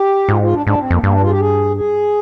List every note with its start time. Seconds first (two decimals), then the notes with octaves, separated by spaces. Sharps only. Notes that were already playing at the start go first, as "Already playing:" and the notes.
Already playing: G4
0.29 G#2 F4
0.42 F4
0.53 D4
0.66 G#2 D4
0.78 C4
0.91 F2 A#3
1.03 G2 A#3
1.12 D4
1.21 F4
1.27 G#4
1.31 G4
1.40 G#4
1.77 G#4